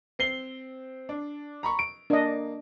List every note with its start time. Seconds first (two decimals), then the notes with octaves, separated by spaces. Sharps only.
0.19 C4 C7 G7
1.09 D4
1.63 A#5 B5 C#6
1.79 D7
2.10 A#3 D4 D#5